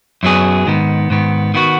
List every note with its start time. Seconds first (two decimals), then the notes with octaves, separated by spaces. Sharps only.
0.23 F#2 F#3 B3 G#4
0.66 G#2 D#3 B3
1.10 G#2 D#3 B3
1.54 D#3 B3 F#4